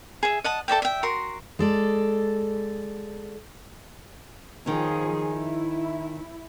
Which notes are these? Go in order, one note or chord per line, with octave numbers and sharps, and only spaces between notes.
G#4 E5
D#5 F#5 A5
A4 D5 E5 G5
E5 G5
F#4 A#4 C6
G#3 A4 D5
D#3 F3 C#4 G#4
E4